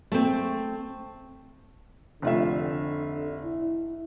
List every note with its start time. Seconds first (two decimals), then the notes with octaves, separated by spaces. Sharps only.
0.12 A3 C4
2.22 F1 D3 F4 E5
3.45 E4